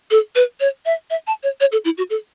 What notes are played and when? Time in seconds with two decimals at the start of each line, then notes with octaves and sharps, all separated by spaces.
0.11 A4
0.35 B4
0.60 C#5
0.86 E5
1.10 E5
1.27 A5
1.43 C#5
1.60 C#5
1.72 A4
1.85 E4
1.98 F#4
2.10 A4